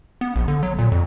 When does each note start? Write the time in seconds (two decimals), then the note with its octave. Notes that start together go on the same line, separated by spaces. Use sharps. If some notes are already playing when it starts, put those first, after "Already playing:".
0.21 B3
0.36 A#1
0.48 D3
0.63 F#3
0.79 A#2
0.92 F2